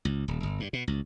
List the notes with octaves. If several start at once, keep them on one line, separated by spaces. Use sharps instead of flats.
C#2
D#1
G1
G2
B2
C#2